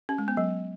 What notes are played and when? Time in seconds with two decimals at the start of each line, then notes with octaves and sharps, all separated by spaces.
0.09 C#4
0.18 G#3
0.28 B3
0.37 F#3